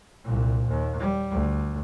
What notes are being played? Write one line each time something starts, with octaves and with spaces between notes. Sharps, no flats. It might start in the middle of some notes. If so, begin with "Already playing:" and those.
C2 A#2
D#2
G3
D2